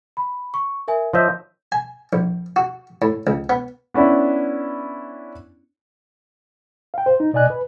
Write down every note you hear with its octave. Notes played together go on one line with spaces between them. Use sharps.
B5
C#6
A#4 E5 G#5
F3 C#5 D#5 E5 G6
G#5
A#1
F#4
A2
C#2
B3
B3 C#4 D4 E4
F5 G5
C5
D#4
B2 D5 D#5 G#5 F#6
B4